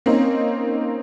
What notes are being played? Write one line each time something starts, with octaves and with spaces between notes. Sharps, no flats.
A#3 C4 C#4 D#4